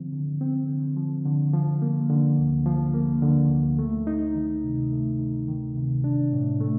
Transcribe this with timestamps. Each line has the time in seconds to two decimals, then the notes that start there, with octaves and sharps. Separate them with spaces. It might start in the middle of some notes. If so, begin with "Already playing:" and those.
Already playing: D3 F3 C4
0.12 D3
0.41 C4
0.69 D3
0.97 F3
1.26 D3
1.54 F3
1.82 A#3
2.10 D3
2.38 D2
2.66 F3
2.94 A#3
3.22 D3
3.50 D2
3.79 A3
4.07 D#4
4.35 D#3
4.63 C3
4.91 A3
5.19 D#4
5.48 D#3
5.76 C3
6.04 D4
6.32 A2
6.61 A3